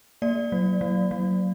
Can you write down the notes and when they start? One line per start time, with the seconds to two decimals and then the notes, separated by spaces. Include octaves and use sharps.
0.22 A#3 D5
0.52 F#3
0.81 F#3
1.11 F#3